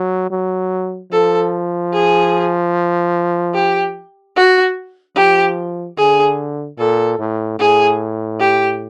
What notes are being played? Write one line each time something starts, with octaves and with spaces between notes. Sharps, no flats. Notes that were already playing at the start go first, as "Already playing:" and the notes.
Already playing: F#3
F#3
F3 A4
G#4
G4
F#4
F3 G4
D3 G#4
A#2 A4
A2
A2 G#4
G4